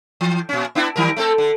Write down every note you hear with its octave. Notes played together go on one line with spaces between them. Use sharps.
E3
A#2 C#4
B3 D4 E4
D#3 G3 A#4
A3 C4 A4
D3